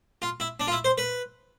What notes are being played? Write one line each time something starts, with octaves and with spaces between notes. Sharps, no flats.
F4
E4
D4
F4
E4
C5
B4